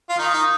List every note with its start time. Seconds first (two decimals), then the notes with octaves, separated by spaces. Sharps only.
0.09 F4
0.18 D#3 D#4
0.33 D#4